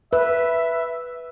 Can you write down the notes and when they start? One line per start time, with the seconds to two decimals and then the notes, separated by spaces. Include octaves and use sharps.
0.13 B4 E5